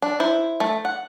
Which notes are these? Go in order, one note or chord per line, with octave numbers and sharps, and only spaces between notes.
D4
E4 C5
A3
F#5